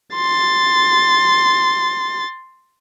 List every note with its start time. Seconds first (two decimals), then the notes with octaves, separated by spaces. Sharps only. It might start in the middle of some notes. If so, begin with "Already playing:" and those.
0.15 C6 A6